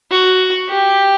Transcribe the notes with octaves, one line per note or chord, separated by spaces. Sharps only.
F#4
G4